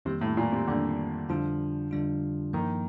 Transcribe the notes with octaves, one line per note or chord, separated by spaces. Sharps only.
F2 C3 D#3 G3 A#3
A2
A#2
C3
F2 D3 D#3 G3 A#3
F2 D3 F3 G3 D4 F4
F2 D3 G3 D4 F4
G2 D#3 F3 A#3